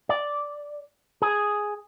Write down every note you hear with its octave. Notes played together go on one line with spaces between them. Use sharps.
D5
G#4